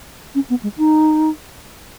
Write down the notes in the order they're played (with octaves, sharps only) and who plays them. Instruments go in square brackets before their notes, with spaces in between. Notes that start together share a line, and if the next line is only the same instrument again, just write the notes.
[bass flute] C#4
B3
G#3
D#4